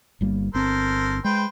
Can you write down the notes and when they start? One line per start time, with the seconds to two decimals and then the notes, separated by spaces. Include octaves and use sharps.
0.21 G1 G3 A#3
0.54 G1 C4 A4 A#4 C5
1.25 G#3 B4 C5 G5